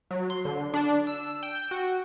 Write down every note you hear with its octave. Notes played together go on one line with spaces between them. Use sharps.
F#3
C6
D3
D4
E6
G5
F#4